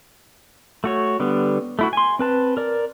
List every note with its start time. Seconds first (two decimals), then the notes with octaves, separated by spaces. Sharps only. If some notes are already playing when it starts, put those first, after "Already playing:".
0.84 A3 F#4 C#5
1.20 D3 G3 B3
1.79 A3 E4 F#4
1.93 G#5 C6
2.19 C4 B4 A5
2.57 A#4 D5